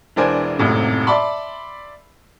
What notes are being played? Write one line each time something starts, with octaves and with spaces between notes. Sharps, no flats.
E1 E3 D4 A#4 C5 G#5
D#1 G#1 F#2 A2 C3
D5 E5 A5 B5 C6